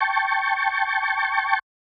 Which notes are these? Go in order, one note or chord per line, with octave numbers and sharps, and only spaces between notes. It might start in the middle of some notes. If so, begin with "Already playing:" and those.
G5 A5 C#6